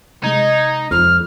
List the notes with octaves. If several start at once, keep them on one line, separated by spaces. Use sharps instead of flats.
C3 G#3 D#4 G#6
F2 F6